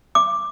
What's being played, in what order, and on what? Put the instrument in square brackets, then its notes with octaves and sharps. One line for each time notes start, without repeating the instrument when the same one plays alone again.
[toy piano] D6